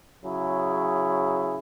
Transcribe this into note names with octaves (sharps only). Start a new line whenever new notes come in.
C#3 F#3 E4 G#4